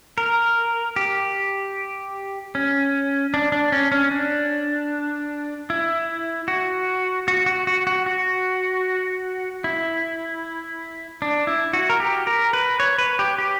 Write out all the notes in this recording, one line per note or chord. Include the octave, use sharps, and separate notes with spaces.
A#4
G4
C#4
D4
D4
C#4
C#4
D4
E4
F#4
F#4
F#4
F#4
F#4
F#4
E4
D4
E4
F#4
A#4
G4
A#4
B4
C#5
B4
G4
G4